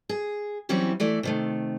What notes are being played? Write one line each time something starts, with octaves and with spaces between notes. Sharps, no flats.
G#4
E3 F#3 G3 C4 C#4 E4
E3 A3 D5
C3 D#3 A3